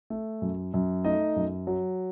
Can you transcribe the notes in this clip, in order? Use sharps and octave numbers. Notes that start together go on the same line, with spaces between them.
A3
F#2
F#2
A3 D#4 D#5
F#2
F#3